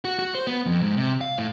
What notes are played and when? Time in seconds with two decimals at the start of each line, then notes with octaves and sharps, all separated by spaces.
0.05 F#4
0.19 F#4
0.35 C5
0.47 B3
0.66 F2
0.83 G#2
0.97 C3
1.21 F5
1.38 A2